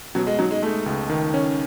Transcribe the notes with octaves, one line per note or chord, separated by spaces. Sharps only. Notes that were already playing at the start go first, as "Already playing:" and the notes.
B2 F#3
G#3
F#3 D#4
G#3
G#3 A3
C#2
D#3
C#4